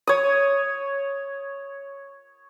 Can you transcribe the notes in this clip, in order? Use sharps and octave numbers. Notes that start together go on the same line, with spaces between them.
C#5 D#6